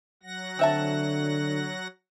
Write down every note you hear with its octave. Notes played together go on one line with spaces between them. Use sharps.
F#3 F#5 A#6
D3 C4 E5 A5